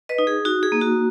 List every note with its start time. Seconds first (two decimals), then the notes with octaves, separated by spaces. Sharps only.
0.09 B4 D#5
0.18 D#4
0.27 G#4
0.45 D#4 F#4
0.63 G#4
0.72 A#3
0.81 F#4